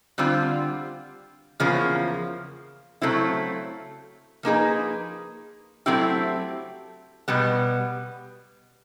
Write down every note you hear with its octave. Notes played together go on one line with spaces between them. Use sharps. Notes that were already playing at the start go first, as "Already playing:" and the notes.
D3 G3 C4 F4
E2 C#3 F3 A#3
C#3 F#3 A3 C4 E4
F3 A#3 D#4 G#4 B4
F#3 A3 C4 E4 G4
B2 G3 B3